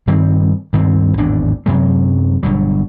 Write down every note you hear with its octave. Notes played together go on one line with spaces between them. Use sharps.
G2 D#3 G3 C4
D2 G2 D#3 C4
G#1 E2 A2 D4
F#2 C3 F#3 G#3
G1 G2 B2 F#3